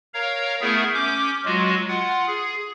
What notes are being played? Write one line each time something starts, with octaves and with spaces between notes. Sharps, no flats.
A#4 C#5 F5 A#5
A3 B3 E4 G#4 A#4 E5
C#4 D6 G6
F#3 G#3 F4 F#4
F4 F#5
G#4